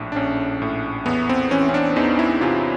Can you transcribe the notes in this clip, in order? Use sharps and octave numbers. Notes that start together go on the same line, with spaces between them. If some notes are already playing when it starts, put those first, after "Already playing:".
Already playing: A#1 A2 D4
D4
A#1 C#4
A2
E2 B3
C4
E3 C#4
C#4
D4
E2 D#4
E4
C3 F4